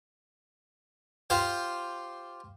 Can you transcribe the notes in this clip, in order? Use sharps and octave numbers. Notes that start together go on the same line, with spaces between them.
F4 G4 C5 F5